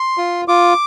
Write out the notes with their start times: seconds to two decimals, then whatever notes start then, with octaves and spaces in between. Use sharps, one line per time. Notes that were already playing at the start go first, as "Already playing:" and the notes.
Already playing: C6
0.18 F4
0.48 F4 D6